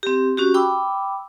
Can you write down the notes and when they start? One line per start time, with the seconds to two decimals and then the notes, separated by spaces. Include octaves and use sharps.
0.03 C4 G4
0.37 C#4 F#4 G4
0.54 G5 B5 D6 E6